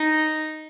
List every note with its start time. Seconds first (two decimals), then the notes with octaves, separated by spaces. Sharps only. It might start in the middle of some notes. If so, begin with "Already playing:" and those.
Already playing: D#4